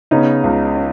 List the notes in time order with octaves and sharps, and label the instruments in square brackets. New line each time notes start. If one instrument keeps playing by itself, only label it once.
[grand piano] C#3 [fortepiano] B3 D#4
[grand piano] C#2
C#4